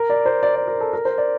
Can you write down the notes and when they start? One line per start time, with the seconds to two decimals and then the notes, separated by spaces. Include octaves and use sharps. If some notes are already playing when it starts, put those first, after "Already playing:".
Already playing: A#4
0.10 D5
0.26 C5
0.43 D5
0.56 D5
0.68 A#4
0.80 A4
0.93 A#4
1.05 C5
1.18 D5